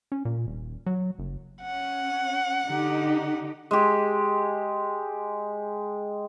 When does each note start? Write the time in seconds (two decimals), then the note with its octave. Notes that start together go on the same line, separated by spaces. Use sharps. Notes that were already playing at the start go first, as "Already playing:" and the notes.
0.12 C#4
0.25 A#2
0.47 D#1
0.86 F#3
1.19 F#1
1.62 C#4 F#5
2.66 D3 D#4 G4
3.71 G#3 G4